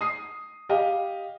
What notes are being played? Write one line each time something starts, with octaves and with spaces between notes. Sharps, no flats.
D#6 C7
G4 D#5 F5